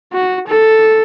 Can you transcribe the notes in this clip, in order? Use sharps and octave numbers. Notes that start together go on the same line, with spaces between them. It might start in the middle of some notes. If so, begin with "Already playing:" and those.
F#4
A4